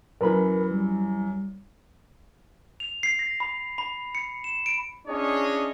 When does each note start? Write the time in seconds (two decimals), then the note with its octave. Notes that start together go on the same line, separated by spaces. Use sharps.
0.21 F#2 E3 A#4 B4 B5
0.71 G3
2.80 F7
3.03 C7
3.19 A#6
3.40 B5
3.78 B5
4.15 C#7
4.44 E7
4.66 D7
5.07 C#4 D4 E4 G#4 C#5 D#5